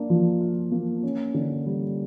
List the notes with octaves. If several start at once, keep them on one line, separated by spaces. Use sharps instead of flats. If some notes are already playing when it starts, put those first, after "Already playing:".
Already playing: A#3 D4
F3
F4
A#3
C#4
D3
G3